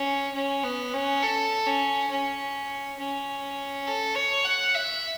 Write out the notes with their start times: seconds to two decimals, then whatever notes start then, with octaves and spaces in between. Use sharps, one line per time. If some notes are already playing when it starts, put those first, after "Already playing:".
Already playing: C#4
0.35 C#4
0.63 B3
0.94 C#4
1.23 A4
1.67 C#4
2.10 C#4
2.99 C#4
3.87 A4
4.15 C#5
4.44 F#5
4.75 E5